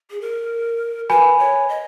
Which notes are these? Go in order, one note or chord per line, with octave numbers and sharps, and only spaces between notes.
G#4
A#4
B4 G#5 B5
C#5
D#5